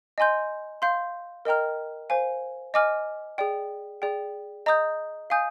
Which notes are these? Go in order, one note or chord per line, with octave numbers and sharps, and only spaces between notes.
D#5 G#5 C6 G6
F5 C6 G6
A#4 D#5 G5 A#5 F6
C5 F5 G#5
D#5 G#5 D6 F6
G#4 D5 G5
G#4 D5 G5
D#5 A#5 D#6 G6
F5 G#5 D#6 G6